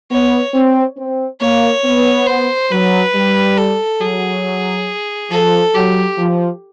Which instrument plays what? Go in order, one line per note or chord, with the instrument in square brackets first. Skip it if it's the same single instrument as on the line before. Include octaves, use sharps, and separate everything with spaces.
[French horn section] B3 [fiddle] C#5
[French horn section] C4
C4
[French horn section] A#3 [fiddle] C#5
[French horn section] B3
[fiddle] C5
[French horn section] F#3 [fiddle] B4
[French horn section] G3
[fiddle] A4
[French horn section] F#3 [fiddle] G#4
[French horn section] F3 [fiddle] A4
[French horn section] F#3 [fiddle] G4
[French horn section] F3